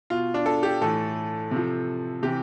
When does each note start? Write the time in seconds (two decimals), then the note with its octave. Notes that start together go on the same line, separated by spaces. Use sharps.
0.10 B2 F4
0.34 D4
0.46 A4
0.63 G4
0.81 A2 E3 A4
1.51 C3 F3
2.22 C3 E3 G4